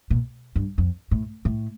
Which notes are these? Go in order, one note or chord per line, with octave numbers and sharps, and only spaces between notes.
A#2
G2
F2
A2
A2